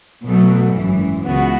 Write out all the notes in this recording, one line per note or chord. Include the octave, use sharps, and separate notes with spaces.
B1 B2 F#3 A3
G#1 F#2 E3
C#2 C#3 E3 B3 F#4